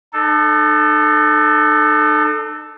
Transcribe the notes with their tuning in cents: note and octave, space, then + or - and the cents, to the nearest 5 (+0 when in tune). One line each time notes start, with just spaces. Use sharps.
D#4 -45 A4 +0